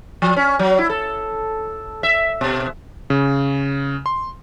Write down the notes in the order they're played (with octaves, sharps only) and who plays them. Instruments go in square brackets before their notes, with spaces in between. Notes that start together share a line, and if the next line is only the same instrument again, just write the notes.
[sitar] F3
C#4
F#3
E4
A4
E5
B2
[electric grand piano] C#3
C6